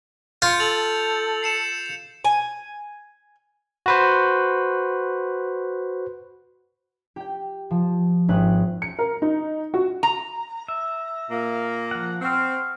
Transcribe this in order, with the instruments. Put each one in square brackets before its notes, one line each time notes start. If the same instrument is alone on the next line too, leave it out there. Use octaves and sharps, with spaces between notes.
[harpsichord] F4 [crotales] G6 C#7
[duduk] A4 [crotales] A6 F7 F#7
[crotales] C7 C#7 E7
[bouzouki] G#5
[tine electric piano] F#4 B4 C5
[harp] G4 G5
F3
G#1 D#4 B4 F#6
[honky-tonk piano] C#7
A#4
D#4
F#4
[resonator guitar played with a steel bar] A#5
[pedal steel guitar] E5
[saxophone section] A#2 A#3
[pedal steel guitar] F3 F#5
[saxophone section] C4 [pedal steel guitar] F#5 C#6 F6